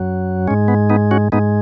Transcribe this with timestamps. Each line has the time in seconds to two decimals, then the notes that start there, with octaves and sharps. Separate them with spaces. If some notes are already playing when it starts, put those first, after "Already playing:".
Already playing: F#2 F#3
0.48 G#3 C#4
0.51 G#2
0.68 B3
0.90 B3 D#4
1.11 C#4 F#4
1.32 G#2 G#3 B3 D#4